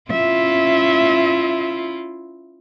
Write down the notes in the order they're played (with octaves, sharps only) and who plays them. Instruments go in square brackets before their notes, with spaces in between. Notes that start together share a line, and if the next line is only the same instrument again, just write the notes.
[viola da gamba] C#4 E4 F4 [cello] E5